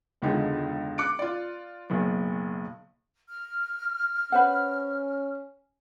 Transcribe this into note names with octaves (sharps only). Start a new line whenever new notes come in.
E1 C#2 D3 D#4 F4 G#4
D6 F#6 C#7 D7
F4 D5
F#1 B1
F6
C#4 B4 C5 F#5